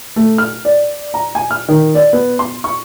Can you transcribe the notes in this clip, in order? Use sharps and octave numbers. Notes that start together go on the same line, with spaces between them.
A3
F6
D5
A#5
G#5
F6
D#3
D5
B3
C6
C#6